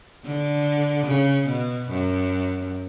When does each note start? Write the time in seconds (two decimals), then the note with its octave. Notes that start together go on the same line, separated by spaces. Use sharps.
0.25 D3
1.07 C#3
1.48 B2
1.90 F#2